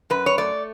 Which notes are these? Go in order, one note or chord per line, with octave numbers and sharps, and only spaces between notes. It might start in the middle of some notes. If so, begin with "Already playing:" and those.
F#2 B4
C#5
A3 D5